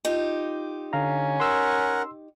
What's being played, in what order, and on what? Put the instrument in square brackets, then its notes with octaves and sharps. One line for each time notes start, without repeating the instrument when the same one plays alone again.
[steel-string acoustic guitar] D#4 F4 G4
[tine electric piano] D3 F5 A#5 [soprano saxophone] C#4
[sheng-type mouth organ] A#4 F#5 [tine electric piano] C6 E6